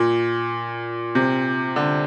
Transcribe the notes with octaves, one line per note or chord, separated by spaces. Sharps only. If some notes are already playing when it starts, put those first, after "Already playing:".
Already playing: A#2
C3
D3